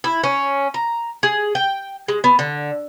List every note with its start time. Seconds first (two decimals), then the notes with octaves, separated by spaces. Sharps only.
0.04 E4
0.24 C#4
0.74 A#5
1.23 G#4
1.55 G5
2.08 G#3
2.24 B3
2.39 D3